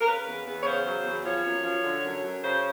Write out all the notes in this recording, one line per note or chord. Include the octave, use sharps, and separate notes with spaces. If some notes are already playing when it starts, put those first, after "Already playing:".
A#4
C#3 B4
E2
E2
C#5
C#3 C5
F#3
E2
F3 C#5
F#2
F3
D3
F#2
F#2
C#3 C5